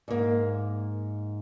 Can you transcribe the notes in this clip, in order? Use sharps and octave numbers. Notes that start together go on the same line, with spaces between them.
G#2 A#3